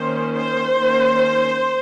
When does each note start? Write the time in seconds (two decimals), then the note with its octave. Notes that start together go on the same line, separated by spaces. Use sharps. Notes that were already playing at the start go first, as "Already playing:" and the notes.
Already playing: D#3 A#3 C#4 C5
0.35 C5
0.75 D#3 A#3 C#4